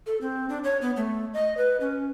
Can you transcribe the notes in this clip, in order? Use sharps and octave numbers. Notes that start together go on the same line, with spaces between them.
A4
C4
D4
C#5
B3
A3
D#5
B4
C#4